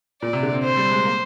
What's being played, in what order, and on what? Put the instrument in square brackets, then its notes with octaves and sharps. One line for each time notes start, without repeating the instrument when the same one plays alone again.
[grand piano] A#2 [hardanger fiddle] D5
[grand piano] C3
D3
C4
[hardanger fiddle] C5
[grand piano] G3
G#3
A#3